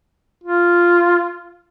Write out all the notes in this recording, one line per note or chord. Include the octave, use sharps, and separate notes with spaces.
F4